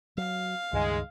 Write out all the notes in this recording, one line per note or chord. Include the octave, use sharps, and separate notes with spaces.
F#3 F5
C#2 G2 D#3 G#3